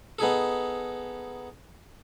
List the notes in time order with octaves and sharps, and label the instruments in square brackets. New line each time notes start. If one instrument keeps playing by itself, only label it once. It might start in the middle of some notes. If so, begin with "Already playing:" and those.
[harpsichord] B3 D#4 G#4 A4